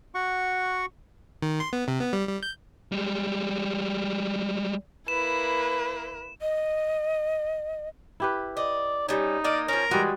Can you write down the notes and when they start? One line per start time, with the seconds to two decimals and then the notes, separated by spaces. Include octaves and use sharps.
0.14 F#4 F#5 C#6
1.42 D#3
1.60 C6
1.73 B3
1.88 C3
2.01 B3
2.13 G3
2.28 G3
2.43 G6
2.92 G3 G#3
5.08 A#3 E4 B4 E7
6.41 D#5
8.20 E4 G4 B4
8.57 D5 D#5
9.08 G3 C#4 D#4
9.44 A#3 D5 D#5 F5
9.68 F3 C#4 A#4
9.91 E3 G3 G#3 F#4